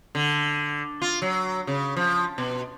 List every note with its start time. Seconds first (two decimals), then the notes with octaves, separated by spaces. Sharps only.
0.15 D3
1.02 F4
1.22 F#3
1.67 C#3
1.97 F3
2.38 B2